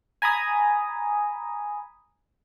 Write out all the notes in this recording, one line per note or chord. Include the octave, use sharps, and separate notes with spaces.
G#5 A#5 B5 D#6